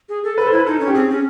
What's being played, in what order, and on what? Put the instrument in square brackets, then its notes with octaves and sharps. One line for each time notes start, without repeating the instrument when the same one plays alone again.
[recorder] G#4
A4
[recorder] A4 [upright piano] B4
[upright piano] C5
[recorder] E4 [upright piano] B4
[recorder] D#4 [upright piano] A4
[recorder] C#4
[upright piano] G4
[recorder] C4 [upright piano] G#4
[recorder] C#4